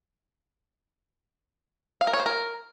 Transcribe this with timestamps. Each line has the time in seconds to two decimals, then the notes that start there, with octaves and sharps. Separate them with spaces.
2.01 F5
2.07 A#4
2.13 C#5
2.20 C5
2.26 A#4